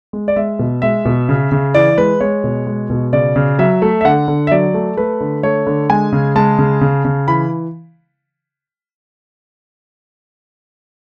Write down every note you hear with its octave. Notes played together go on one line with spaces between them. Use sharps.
G#3
D5
G#3 E5
B2
G#3 E5
B2
C#3
C#3
E3 D5
G#3 B4
G#3 C#5
B2
G#3
B2
C#3 D5
C#3
F#3 E5
A3
E5
D3 F#5
D3
E5
F#3 D5
A3
A3 B4
D3
A3 C#5
D3
G#3 G#5
C#3
G#3 A5
C#3
C#3
C#3
E3 B5